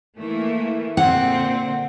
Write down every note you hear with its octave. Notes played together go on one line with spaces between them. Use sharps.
E3 A3 A#3
A#2 D3 C4 F#5